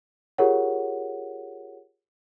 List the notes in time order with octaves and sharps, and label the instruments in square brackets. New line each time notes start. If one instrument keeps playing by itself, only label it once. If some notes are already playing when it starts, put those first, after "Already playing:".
[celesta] F4 G4 G#4 A#4 C#5 F#5